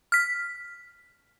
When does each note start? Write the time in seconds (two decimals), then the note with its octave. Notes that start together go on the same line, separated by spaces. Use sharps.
0.12 F6 B6